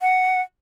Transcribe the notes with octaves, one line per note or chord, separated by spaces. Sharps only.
F#5